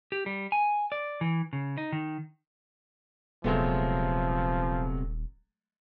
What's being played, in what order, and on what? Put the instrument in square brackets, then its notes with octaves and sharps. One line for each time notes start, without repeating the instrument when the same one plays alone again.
[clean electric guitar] G4
G3
G#5
D5
E3
C#3
D#4
D#3
[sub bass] D#1 [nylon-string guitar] C3 B3 [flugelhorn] F3 [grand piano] F#3 G#3 A3